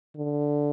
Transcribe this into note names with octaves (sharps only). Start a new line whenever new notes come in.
D3